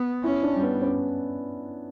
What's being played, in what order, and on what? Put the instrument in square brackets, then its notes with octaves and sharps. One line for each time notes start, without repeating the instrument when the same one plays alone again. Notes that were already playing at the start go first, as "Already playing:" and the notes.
Already playing: [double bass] B3
[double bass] C#4 [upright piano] E4
[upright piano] D4
[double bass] G3
[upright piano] B3
C#4